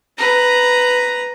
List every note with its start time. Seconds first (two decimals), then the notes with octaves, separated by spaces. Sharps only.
0.18 B4 A#5